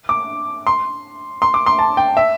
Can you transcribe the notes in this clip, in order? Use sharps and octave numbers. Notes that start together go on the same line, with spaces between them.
D6
C6
C6
D6
C6
A5
G5
E5